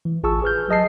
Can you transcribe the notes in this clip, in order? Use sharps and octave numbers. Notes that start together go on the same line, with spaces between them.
E3
A1 F4 G#4 A5 C#6 E6
G#4 B4 F6 G6
F#3 G#4 D#5 A5 C7